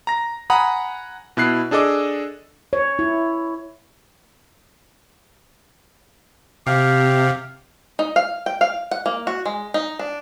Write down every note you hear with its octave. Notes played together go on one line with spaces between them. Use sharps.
A#5 A#6
F#5 G#5 A#5 B5 D#6
B2 E4 F#6 C7
D4 G#4 A4 D#5 D6
C#5
E4
C3 G4 F5
D#4
F5
G5
F5
F#5
A#3
F#4
G#3
D#4
D4